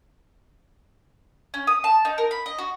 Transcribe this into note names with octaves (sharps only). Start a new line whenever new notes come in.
C#4
D#6
A5
D#4
A#4
B5
D#5
F#4